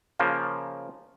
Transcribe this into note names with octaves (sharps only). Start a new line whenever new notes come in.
C#3 F3 A#3